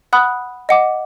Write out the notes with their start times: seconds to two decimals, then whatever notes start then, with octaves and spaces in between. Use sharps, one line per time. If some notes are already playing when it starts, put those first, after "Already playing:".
0.13 F#5 B5 D#6 F#6
0.69 D#5 F#5 D6